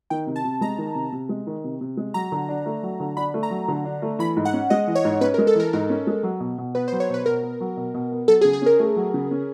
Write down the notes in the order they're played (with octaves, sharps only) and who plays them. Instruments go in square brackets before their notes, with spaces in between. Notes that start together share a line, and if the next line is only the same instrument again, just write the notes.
[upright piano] D#3 [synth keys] G5
[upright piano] C3
[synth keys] A5
[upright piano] C3
[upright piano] G#3 [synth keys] A#5
[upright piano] D#3
C3
C3
G#3
D#3
C3
C3
G#3
[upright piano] F#3 [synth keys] A#5
[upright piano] D3
D4
A3
F#3
D3
[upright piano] D4 [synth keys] B5
[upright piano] A3
[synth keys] A#5
[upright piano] F#3
D3
D4
A3
[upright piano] E3 [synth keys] B5
[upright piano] G#2
[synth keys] F#5
[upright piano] C#4
[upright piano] G#3 [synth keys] D#5
[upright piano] E3
[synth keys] C#5
[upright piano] G#2
[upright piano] C#4 [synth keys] B4
[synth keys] A#4
[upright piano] G#3
[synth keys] A4
[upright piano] E3 [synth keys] A#4
[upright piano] G#2 [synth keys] A#4
[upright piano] C#4
G#3
F#3
B2
B2
[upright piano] B3 [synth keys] B4
[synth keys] C5
[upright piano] F#3
[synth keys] C#5
[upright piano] B2 [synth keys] B4
[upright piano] B2 [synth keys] A#4
[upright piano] B3
F#3
B2
B2
B3
[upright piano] F#3 [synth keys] A4
[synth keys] G#4
[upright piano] C#3
[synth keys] G#4
[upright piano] C#4 [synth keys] A#4
[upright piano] A3
F#3
C#3
C#4